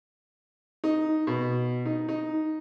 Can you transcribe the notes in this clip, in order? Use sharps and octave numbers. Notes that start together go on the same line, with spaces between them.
D#4
B2
D#4
D#4